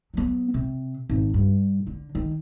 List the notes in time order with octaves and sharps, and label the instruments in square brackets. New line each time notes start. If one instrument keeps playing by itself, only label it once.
[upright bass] F#3 B3
C3
G#1
G2
D3
D#3